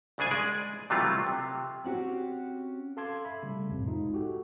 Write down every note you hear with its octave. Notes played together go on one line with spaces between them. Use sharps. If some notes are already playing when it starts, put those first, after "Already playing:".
C2 C#3 D4 G#4 G#5
G#3 G#4 D5
C3 E3 F#3 G3 A3 F4
C3
C4 C#4 F#4 G4
A4 F5 A5 C6 D6 G#6
E5 B5
C#3 G3 A3
C2 F2 A2 C3
G#3 D#4 F4
F#4 G4 A4